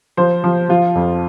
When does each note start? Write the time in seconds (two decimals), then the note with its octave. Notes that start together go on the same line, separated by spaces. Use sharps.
0.17 F3 C5
0.44 F3
0.69 F3 F4
0.95 F2